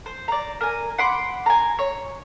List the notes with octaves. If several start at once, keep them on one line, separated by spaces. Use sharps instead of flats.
C5
D5 A#5
A#4 G#5
F#5 B5 C6 D6
G#5 A#5
C#5